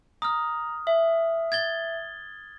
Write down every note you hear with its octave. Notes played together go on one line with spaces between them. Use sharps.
A#5 D#6 F6
E5
G#6 A6 G7